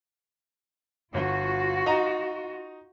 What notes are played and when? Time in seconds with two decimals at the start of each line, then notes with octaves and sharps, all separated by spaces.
1.14 G1 F4 F#4
1.86 D#4 A#5